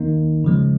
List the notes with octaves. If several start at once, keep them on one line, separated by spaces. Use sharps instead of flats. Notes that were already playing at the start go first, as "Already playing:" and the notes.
Already playing: D#3 A#3 D#4
C#3 F3 G#3